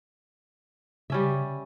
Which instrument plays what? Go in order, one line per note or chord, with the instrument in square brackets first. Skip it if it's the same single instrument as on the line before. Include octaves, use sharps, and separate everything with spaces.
[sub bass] C#3 [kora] G3 C#4 E5